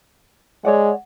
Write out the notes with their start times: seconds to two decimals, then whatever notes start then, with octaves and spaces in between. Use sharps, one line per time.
0.65 G#3 C#5 D5 F#5